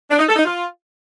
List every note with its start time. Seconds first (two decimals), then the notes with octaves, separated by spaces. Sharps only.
0.10 D4
0.19 D#4
0.27 A4
0.36 D#4
0.45 F4